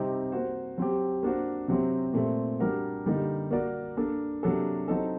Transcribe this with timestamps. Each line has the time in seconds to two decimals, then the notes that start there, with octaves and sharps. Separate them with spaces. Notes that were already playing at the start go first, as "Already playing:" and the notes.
Already playing: C3 G3 C4 D#4 G4
0.32 A#3 F#4 C5
0.78 F#3 C4 G4
1.23 A#3 D4 F#4 C5
1.68 C3 F#3 C4
2.14 A#2 A3 C4
2.60 G3 A#3 D4 F#4 A#4
3.06 D3 G3 A#3 D#4
3.51 A#3 F#4 A#4 D5
3.97 A#3 D4 A4
4.43 C3 F#3 A#3 D4 A4
4.88 F#3 C4 D#4 A4